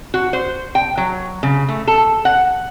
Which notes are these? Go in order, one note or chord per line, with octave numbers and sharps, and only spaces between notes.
F#4
C5
G5
F#3
C#3
A3
A4
F#5